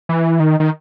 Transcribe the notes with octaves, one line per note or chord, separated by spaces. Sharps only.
E3
D#3
D#3